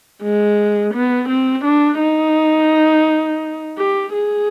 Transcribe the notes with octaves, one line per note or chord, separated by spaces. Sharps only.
G#3
B3
C4
D4
D#4
G4
G#4